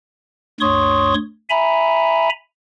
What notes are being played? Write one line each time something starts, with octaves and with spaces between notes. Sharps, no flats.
D2 G2 C#5 C6 C#6 D#6
E5 G#5 A#5 B5